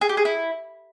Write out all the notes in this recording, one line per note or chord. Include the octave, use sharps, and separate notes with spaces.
G#4
G4
G#4
E4